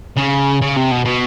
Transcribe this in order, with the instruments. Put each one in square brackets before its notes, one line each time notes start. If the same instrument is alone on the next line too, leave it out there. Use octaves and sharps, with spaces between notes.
[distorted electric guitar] C#3
C#3
C3
B2
B2